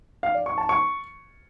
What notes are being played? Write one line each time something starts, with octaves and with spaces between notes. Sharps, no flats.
F5
D5
C#6
A5
C#6